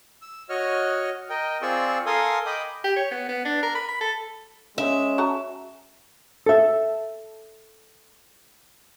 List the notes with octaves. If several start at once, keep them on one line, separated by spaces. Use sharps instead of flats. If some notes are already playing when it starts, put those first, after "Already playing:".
E6
F#4 C#5 D#5 C#6 F6
A#4 D#5 G5
C4 F4 G#4 D5 C#6 E6
A4 A#4 F5 G#5 C6 D#6
D#5 G5 B5 D6 D#6
G4
C#5
B3
B3
D4
A#4
B5
B5
A4
G#3 C#4 E5
F#4 A5 A#5
A4 E5